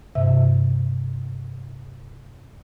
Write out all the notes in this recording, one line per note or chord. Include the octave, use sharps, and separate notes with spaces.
G2 C3 E5